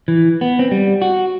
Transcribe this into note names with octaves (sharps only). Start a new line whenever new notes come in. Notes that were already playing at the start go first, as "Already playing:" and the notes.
E3
B3
C4
G3
F#4